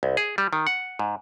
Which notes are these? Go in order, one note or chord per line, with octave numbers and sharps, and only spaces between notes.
C2
G#4
G3
D#3
F#5
G#2